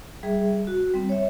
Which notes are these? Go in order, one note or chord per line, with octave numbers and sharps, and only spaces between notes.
G3 G#4 E5
F#4
G3 C4
C#5 E5